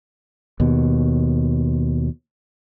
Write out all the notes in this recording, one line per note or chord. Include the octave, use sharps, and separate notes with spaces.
D#2 B2